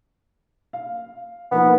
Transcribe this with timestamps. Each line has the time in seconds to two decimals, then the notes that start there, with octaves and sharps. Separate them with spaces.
0.73 F5
1.51 F3 A#3 B3 D#4